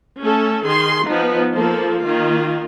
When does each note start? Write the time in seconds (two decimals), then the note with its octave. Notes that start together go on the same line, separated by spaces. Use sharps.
0.21 A3 C#4 A4
0.65 D#3 G#4 C6
1.05 F3 B3 D#4
1.54 F3 A#3 A4
2.03 D#3 A#3 F4